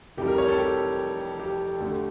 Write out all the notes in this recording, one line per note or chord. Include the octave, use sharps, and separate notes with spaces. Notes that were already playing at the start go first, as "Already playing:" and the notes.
F1 F2 E3 G3 G4
A#4
C#5
A4
G4
G4
D2 D3 A3